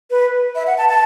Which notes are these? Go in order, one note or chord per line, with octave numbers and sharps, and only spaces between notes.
B4
E5
F#5
A5
A5